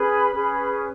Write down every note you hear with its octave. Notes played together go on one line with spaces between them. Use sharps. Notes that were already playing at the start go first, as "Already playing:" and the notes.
Already playing: C#4 G#4 B4 B5
C#4 G#4 B4